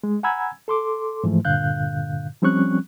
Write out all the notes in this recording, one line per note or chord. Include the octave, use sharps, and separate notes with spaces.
G#3
F#5 G#5 A#5 B5 E6 G#6
A4 C6 D6
G#2 E3 F3 A3
G2 A#2 D3 F5 F#6 G6
F3 G3 C4 C#4 C#6 F#6